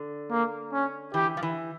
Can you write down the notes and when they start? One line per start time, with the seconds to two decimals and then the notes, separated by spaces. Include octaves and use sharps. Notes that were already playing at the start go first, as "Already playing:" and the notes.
Already playing: D3
0.30 A#3
0.72 C#4
1.14 E3 G4
1.37 F3
1.43 E3